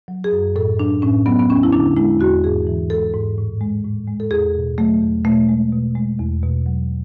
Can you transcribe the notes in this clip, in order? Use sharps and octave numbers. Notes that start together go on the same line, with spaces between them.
F#3
G#4
F#2
A2 A4
F#3 D4
A2 C#4
F#3 B3
B3
E2 C#4
E4
D3 D4
G#3 E4
E2 F#4
G#2 G#4
E3
G#3 A4
G#2
A2
G#3
A2
G#3
A4
E2 G#4
B2
F#3 A3
E2
B2 A3
G#3
B2
G#3
E2
B2
F#3